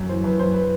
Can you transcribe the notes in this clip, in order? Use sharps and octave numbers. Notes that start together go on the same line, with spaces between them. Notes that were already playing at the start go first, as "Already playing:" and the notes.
Already playing: F#2
E3 C5
F#2 B4
E3 C5
B4